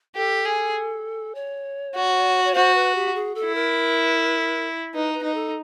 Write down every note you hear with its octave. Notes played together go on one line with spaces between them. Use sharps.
G4 A4
G#4
C#5
F#4
C#5
F#4 C5
B4
G4
G#4
A4
E4
A#4
D#4 B4
B4
D#4
A4